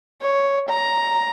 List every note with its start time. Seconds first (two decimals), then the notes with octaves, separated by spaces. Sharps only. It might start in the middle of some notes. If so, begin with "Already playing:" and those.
0.21 C#5
0.68 A#5